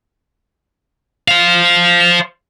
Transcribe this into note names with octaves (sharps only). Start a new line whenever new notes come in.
C5 F5